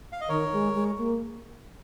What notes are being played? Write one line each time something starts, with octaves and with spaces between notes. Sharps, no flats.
F5
D#5
D#3 A#4 C#5
G#3
G#3
A#3